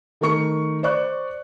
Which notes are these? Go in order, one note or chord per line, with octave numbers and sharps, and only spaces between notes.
D#3 A3 A#4 C#6 C#7
C5 D5 C#6 F#6